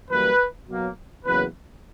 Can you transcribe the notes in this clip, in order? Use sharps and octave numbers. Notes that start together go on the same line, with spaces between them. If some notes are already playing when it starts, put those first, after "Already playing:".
F#2 E3 G3 A#3 B4
B2 F#3 A#3
E2 C#3 F#3 A#3 B4